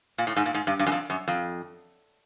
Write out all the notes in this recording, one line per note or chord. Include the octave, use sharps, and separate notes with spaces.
A#2
A2
G#2
A#2
G#2
G2
G2
F#2
F2
F#2
F2